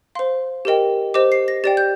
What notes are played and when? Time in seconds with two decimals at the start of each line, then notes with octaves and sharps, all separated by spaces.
0.15 C5 F5 C6
0.65 G4 A#4 D#5 G5
1.14 G4 C5 D#5 D6
1.32 C7
1.48 A#6
1.64 G4 D5 G5 A6
1.77 G6